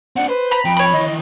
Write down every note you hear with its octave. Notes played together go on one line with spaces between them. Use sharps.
C4 D4 F#5
B4 C5
A#5 B5
F2 G5
C#5 B5
D#3 E3 D#5